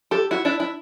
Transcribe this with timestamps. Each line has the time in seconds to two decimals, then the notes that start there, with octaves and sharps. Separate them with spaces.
0.11 G4 A4
0.31 E4 F#4
0.45 D4 E4
0.60 D4 E4